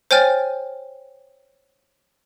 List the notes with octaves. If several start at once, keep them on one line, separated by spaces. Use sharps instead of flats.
C5 C#5 G5 G#5 F6 A6